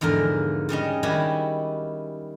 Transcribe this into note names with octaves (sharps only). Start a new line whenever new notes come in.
E2 G#2 D3 F3 A#4
C#3 G3 C#4 D#5
D#3 G3 E4 F#4 G4 G#5